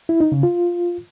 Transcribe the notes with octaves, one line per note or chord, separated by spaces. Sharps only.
E4
D#4
C#3
F4